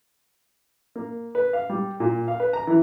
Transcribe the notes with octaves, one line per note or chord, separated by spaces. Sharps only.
A#3
B4
F5
G3
A#2
F5
B4
A#5
E3